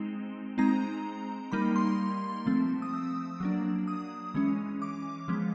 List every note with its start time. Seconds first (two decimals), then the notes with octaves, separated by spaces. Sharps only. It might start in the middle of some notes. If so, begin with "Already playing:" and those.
Already playing: G#3 C4 D#4
0.58 G#3 C4 D#4 A#5
1.52 G3 A#3 D#4 B5
1.76 C6
2.46 F3 A3 C4
2.82 D#6
2.94 E6
3.40 F#3 A#3 D4
3.88 D#6
4.34 E3 G#3 C#4
4.82 D6
5.28 F3 G#3 B3